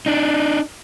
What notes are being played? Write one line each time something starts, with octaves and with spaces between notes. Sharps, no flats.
D4 D#4